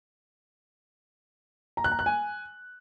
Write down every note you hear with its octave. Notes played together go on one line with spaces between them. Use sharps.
A#5
F#6
A#5
F#6
G#5